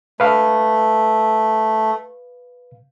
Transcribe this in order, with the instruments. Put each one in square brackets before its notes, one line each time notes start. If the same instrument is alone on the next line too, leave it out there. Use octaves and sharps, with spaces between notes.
[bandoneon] A3 [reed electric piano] B4 F5